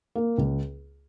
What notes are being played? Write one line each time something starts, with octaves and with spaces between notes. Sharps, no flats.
A#3
C#2